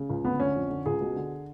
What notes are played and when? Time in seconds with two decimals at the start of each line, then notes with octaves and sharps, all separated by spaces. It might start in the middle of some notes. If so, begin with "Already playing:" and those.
Already playing: C#3
0.10 C#2
0.24 D2 B3
0.40 D3 C#4
0.55 F2
0.70 D3
0.86 C#2 G#4
1.01 B2
1.16 D3